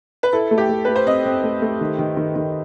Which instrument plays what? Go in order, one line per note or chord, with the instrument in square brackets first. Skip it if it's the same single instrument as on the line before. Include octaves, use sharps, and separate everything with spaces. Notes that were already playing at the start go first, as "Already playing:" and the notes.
[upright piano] B4
[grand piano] E4 [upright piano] A4
[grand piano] A3
[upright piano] G4
[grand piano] A3
[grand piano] A3 [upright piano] B4
[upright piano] C5
[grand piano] C4 [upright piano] D#5
[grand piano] C4
A3
A3
D#3
D#3
D#3
D#3